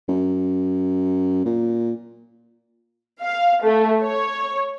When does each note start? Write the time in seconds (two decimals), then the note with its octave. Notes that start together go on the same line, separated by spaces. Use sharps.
0.08 F#2
1.45 A#2
3.22 F5
3.63 A3
4.01 C#5